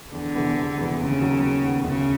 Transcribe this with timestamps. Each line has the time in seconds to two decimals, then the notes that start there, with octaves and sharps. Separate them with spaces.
0.12 E2 D3
0.34 C3 E3 G#3 B3
0.55 E2
0.77 C3 E3 G#3 B3
0.99 D#2 C#3
1.20 D#3 F#3 B3
1.42 D#2
1.64 D#3 F#3 B3
1.85 D2 C#3